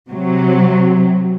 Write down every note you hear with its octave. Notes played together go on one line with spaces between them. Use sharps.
C3 F#3